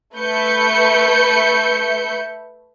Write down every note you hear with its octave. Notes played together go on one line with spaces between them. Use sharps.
A3 B4 E5 G6 C#7